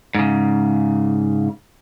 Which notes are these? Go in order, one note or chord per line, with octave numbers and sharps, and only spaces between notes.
G#2 C#3